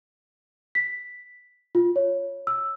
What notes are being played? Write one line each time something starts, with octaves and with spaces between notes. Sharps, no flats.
B6
F4
C#5
E6